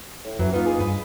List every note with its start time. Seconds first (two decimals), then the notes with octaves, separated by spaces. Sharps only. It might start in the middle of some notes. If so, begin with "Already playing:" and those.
0.25 A2
0.39 F#2 E3 F#3
0.52 A#3 B3 D#4 F4
0.66 G#4
0.79 G2 B4 D#5